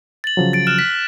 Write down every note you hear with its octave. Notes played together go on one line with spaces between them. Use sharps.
A6 F#7
C#3 F3 F#3
A6 D7
F6 F#6 E7
B6